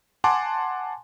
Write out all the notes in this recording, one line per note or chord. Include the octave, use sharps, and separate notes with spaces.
F#5 G#5 A5 C6 D6